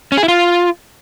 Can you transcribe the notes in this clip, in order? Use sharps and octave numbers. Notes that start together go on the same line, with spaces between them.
C#4
G#4
E4
F4